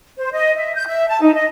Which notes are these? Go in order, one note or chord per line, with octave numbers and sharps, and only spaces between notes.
C5
D#5
E5
G6
E5
A5
D#4
D#5